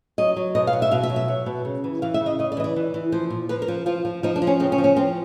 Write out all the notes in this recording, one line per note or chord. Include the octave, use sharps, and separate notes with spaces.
F#3 D#5
F#3
B2 D#5
F5
F#3
E5
B2 F5
E5
F#3
E5
F#3
B2
C#3
E3
E3 F5
E5
C#3
D#5
C#3 D#5
D5
E3 D#5
D5
E3
E3
F3 C5
A#2
F3 B4
A#4
F3
F3 F4
F3
F3 D#4
D4
F3
C#4
C#3 C4
C#4
F3
C#4
F3 C4